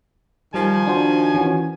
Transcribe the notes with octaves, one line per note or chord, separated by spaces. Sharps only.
D#3 F3 G3 G#5
D4 F#4 C5
E3 C#4 F#4